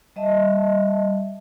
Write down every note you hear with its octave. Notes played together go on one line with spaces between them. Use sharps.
G3 D#5 E5 A5